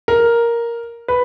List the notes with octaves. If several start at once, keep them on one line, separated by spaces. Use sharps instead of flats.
A#4
B4